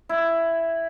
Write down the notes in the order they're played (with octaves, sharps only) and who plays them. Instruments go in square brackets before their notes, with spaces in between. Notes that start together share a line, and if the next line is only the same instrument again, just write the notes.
[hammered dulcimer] E4